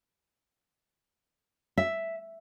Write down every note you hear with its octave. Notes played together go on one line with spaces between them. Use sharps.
E5